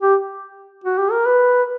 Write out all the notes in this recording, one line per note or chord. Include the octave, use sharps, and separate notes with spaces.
G4
F#4
G4
A#4
B4